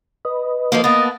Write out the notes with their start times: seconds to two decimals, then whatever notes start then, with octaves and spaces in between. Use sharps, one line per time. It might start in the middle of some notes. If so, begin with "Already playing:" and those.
0.25 B4 D#5
0.72 D#3 F3 A#3
0.84 A#3 B3 D#5 A5